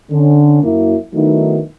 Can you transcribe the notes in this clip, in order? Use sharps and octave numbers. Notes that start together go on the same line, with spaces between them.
D3 C#4
F#2 F#3 A#3 E4
D#3 F#3 A3 B3 D#4 E4